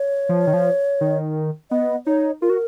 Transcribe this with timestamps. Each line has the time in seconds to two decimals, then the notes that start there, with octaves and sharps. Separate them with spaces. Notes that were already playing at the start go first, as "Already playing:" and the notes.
Already playing: C#5
0.29 F3
0.47 D#3
0.53 F3
1.01 D#3
1.71 B3 D#5
2.07 D#4 C#5
2.42 F4 A#4
2.50 F#4